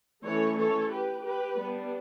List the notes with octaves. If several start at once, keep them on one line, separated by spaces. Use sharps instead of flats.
E3 A3 C#4 A4 C#5
A4 C#5
G4 B4
G4 B4
G3 B3 D4